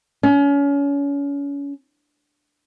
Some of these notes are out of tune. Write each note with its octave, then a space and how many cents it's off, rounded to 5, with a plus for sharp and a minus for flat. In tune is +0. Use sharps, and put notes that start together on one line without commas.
C#4 +30